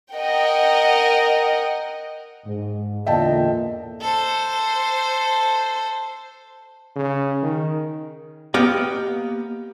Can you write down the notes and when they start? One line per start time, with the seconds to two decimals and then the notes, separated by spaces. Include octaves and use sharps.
0.13 A#4 D#5 F#5 G5
2.46 G#2
3.07 E2 A#2 D3 D#5 E5 G5 A5
4.01 A4 C5
6.96 C#3
7.42 D#3
8.54 A#3 B3 G4 D#5 F5